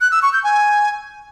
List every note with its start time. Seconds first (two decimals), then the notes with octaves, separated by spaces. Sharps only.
0.01 F#6
0.12 E6
0.22 C#6
0.33 G6
0.44 G#5